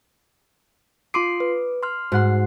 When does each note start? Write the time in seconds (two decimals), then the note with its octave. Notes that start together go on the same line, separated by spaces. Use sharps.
1.14 F4 C6 D6 D#6 C7
1.40 B4
1.83 C6 F6
2.12 G#2 F#4 F#5 C6